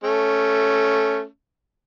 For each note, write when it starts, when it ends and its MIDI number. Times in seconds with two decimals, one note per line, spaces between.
0.04 1.26 57
0.04 1.26 61